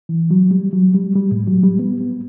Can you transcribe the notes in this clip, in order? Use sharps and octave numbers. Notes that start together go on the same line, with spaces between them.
E3
F#3
G3
F#3
G3
G3
A2
F#3
G3
B3
B3